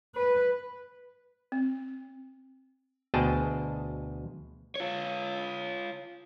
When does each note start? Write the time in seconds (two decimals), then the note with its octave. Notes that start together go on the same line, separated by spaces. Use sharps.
0.15 B4
1.52 C4
3.14 D2 B2 G#4 D#5 G5 A5
4.76 F4 C#5